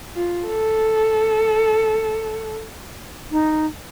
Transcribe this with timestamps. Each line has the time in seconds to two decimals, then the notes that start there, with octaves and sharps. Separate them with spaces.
0.16 F4
0.46 A4
3.31 D#4